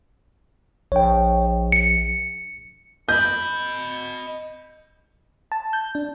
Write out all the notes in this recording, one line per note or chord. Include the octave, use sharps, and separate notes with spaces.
A#1 C#5 G5
C#7
D#5 B5 G6
A5
G6
D4